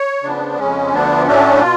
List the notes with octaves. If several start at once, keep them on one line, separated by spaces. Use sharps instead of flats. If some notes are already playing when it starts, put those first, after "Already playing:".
Already playing: C#5
C#3 F3 B3 D4
F2 C#3 G#3 C#4
D2 D3 F3 B3 D4
A2 F#3 A3 C#4 D4
B2 F4